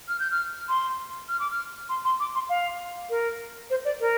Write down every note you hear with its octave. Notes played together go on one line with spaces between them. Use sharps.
F6
G6
F6
C6
F6
D6
F6
C6
C6
D6
C6
F5
A#4
C5
D5
A#4